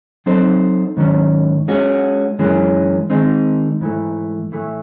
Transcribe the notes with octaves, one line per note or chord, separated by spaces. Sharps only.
F#3 C4 D#4 A4 C5
G#2 D#3 F#3 C#4
G#3 C#4 F#4
F#2 E3 G#3 C#4
D#3 G#3 C4 D#4
G#2 E3 A3
A2 E3 A3